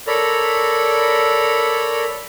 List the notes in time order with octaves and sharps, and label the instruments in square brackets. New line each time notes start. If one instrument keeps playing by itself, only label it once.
[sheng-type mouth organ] A4 A#4 C#5 D5 A#5 B5